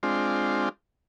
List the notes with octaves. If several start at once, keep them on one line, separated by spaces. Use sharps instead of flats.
G#3 C4 D4 F4